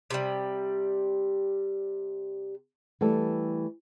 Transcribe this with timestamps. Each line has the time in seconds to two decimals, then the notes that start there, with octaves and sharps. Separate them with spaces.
0.10 C3 E3 G3
3.01 E3 G3 A3 A4